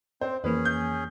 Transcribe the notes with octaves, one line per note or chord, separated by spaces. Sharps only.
C4 C5
F2 E3 A#3 C#4 G#4 B4
G6